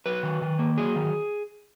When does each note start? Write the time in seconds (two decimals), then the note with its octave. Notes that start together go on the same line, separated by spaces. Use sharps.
0.06 F#3 B4
0.23 D#3
0.41 D#3
0.59 A#3
0.78 F#3 G#4
0.95 D#3